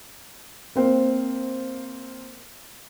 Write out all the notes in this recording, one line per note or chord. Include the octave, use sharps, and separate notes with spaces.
A#3 C4 C5